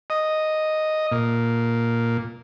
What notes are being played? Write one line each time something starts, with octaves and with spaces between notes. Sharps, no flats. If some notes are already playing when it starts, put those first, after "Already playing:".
D#5
A#2